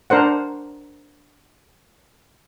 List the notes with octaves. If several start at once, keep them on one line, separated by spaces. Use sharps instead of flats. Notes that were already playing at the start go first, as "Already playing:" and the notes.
D4 A#4 C5 F#5